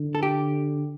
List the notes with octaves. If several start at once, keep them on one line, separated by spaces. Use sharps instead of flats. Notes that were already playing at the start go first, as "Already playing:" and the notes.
Already playing: D3
A4
G4